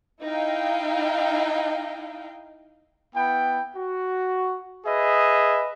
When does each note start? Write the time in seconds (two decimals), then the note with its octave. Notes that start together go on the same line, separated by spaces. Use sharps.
0.24 D#4 E4 D#5 F5 G5
3.16 B3 E4 G5
3.76 F#4
4.86 G#4 B4 D#5 E5